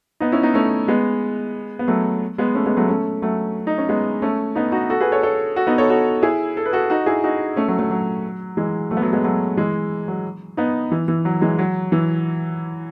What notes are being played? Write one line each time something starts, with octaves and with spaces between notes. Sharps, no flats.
B3 D#4
C#4 E4
B3 D#4
A3 C#4
G#3 B3
B3
F#3 A3
G#3 B3
A3 C#4
G#3 B3
F#3 A3
A3 C#4
F#3 A3
D#4
C#4
G#3 B3
A3 C#4
B3 D#4
D#4 F#4
F#4 A4
G#4 B4
A4 C#5
A4 C#5
F#4 A4
B3 D#4
A4 C#5
F#4 A4
E4 G#4
A4
B4
F#4 A4
D#4 F#4
E4 G#4
D#4 F#4
A3 C#4
F#3 A3
F#3 A3
F#3
E3 G#3
F#3 A3
B3
F#3 A3
G#3 B3
F#3 A3
E3 G#3
F#3
B3 D#4
E3
E3
F#3
E3 G#3
F#3
E3